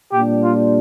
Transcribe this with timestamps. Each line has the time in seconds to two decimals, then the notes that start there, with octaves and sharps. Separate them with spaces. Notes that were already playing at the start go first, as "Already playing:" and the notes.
0.13 A#2 G3 D4 G4
0.43 F4